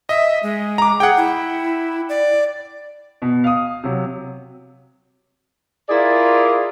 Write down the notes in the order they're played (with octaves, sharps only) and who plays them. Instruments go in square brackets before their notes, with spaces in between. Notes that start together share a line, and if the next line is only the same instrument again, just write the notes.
[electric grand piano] D#5 [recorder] E5
[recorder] G#3
[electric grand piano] A#5 D6
[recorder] G#4 [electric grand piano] F#5 G5
[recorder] E4
D5
[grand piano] B2
F5 D#6
C3 F#3
[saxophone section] E4 F4 G#4 A#4 D5